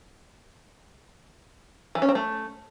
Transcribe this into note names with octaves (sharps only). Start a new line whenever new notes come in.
E3
C#4
C4
A3